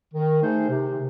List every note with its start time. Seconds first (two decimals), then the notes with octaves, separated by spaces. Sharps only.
0.14 D#3
0.43 A3 D#4 G#4 C5
0.70 C3